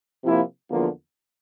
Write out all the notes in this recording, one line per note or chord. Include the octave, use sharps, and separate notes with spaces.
C3 F3 A#3 E4
E2 D3 F3 A#3 F4